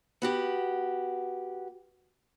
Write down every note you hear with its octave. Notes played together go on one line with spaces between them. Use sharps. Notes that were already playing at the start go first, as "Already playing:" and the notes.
B3 F#4 G4